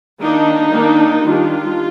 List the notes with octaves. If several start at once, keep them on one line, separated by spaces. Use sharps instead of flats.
D#3 A#3 D4 D#4
D#3 A#3 D4
D#3 G3 D4 F4